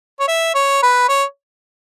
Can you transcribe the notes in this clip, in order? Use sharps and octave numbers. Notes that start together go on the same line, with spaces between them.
C#5
E5
C#5
B4
C#5